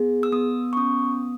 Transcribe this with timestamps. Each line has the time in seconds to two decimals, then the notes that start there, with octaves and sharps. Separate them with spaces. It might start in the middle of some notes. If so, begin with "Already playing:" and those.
Already playing: B3 G#4
0.23 E6
0.32 B3 D#6
0.73 C#6
0.77 C#4 D#6